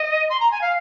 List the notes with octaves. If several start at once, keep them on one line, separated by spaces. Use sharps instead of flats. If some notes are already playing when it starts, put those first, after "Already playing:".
Already playing: D#5
C6
A#5
G#5
F5